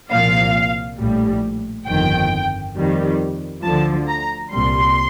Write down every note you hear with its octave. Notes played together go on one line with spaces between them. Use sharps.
C2 A#2 F3 F5
A#1 A2 G3
G1 F2 D#3 G5
F2 D#3 G3
D2 D3 F3 A5
A#5
C2 A#2 G3 C6